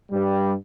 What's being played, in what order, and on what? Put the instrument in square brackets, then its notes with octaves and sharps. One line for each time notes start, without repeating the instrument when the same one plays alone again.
[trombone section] G2 G3